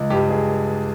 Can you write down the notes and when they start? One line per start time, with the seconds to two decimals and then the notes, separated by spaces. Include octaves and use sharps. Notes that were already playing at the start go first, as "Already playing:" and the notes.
Already playing: C#2
0.10 G2 G4
0.29 G#4